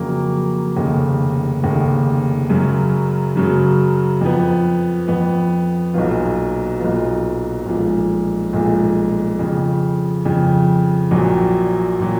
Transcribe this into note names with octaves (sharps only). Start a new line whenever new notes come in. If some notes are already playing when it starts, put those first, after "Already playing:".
Already playing: F2 C#3 F#3 A#3
F1 D#2 C#3
F1 D#2 C#3
F#2 C#3 F#3
F#2 C#3 F#3
F2 F3 B3
F2 F3 B3
B1 A#2 F#3 B3 F4
B1 A#2 F#3 B3 F4
B1 A#2 F3 G#3
B1 A#2 F3 G#3
F2 C#3 F3
F2 C#3 F3
A#1 A#2 F#3
A#2 F#3